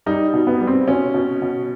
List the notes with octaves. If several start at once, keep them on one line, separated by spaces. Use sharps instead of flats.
G3 D#4
B2
B3
G3
C4
B2 C#4
B2
B2